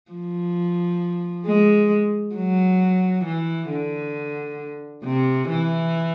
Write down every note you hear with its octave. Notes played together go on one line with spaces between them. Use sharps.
F3
G#3
F#3
E3
D3
C3
E3